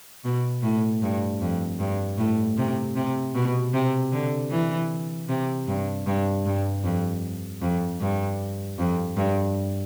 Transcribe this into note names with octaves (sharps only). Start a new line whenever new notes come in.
B2
A2
G2
F2
G2
A2
C3
C3
B2
C3
D3
E3
C3
G2
G2
G2
F2
F2
G2
F2
G2